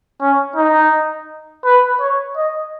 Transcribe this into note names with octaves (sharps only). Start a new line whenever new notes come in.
C#4
D#4
B4
C#5
D#5